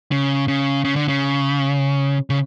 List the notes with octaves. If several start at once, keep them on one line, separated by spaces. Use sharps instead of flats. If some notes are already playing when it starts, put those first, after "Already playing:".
C#3
C#3
C#3
D3
C#3
C#3